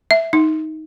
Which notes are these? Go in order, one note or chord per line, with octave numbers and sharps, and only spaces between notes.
E5
D#4